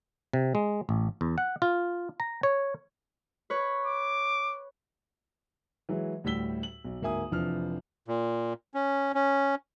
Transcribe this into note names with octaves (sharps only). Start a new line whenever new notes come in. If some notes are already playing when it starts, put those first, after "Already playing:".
C3
G#3
A1
E2
F#5
F4
A#5
C#5
B4 C#5
D6
E3 F#3 G#3
D2 A2 G3 E6 B6 G7
F#7
B1
D1 G#2 A#3 E5 G#5 D#6
F1 E3 F3 D4 F6
A#2
C#4
C#4